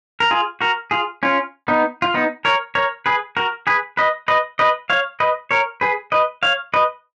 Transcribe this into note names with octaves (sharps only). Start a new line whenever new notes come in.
A#4
F4 G#4
F#4 A#4
F4 G#4
C#4 F4
B3 D#4
F4
B3 D#4
A#4 C#5
A#4 C#5
G#4 B4
F#4 A#4
G#4 B4
B4 D#5
B4 D#5
B4 D#5
C#5 F5
B4 D#5
A#4 C#5
G#4 B4
B4 D#5
C#5 F5
B4 D#5